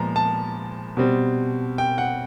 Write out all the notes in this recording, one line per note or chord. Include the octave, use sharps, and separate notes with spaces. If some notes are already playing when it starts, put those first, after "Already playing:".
Already playing: A#2 F3 G#3 B3 A#5
A5
B2 G3 C4
G5
F#5